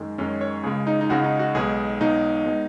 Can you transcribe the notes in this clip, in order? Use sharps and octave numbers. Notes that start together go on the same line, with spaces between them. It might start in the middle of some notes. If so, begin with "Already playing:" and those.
Already playing: F#2 D#3 G#3
F#2 D#3 G#3 C#4
C#5
C#2 C#3 G#3 G#4
D#4
D#4
C#2 C#3 G#3 F#4
D#4
F#4
B1 B2 G#3 G#4
B1 B2 G#3 D#4
B2 G#3